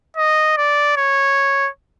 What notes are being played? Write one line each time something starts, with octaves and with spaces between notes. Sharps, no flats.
D#5
D5
C#5